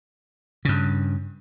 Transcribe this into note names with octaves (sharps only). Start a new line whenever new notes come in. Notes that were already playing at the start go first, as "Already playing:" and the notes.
G2 C#3